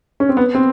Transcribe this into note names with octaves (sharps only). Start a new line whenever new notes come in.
C#4
C4
B3
C4